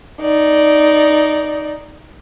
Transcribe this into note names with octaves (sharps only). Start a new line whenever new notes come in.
D#4 D5